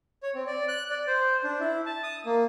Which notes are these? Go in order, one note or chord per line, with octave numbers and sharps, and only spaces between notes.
C#5
C4
D5
F#6
D5
C5
D4
E4
A5
D#6
A#3